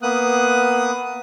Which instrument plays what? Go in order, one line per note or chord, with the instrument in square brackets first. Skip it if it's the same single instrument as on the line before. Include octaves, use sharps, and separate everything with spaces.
[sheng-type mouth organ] A#3 B3 D#6 F#6